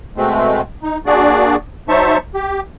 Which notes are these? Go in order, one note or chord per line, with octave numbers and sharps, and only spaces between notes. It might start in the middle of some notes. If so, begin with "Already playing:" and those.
B2 G#3 A3 C4
D#4
A#3 D4 F#4 G#4 D5
F#3 D#4 C5 E5 A5 C#6
G4